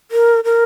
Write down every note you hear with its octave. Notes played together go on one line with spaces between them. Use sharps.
A#4
A#4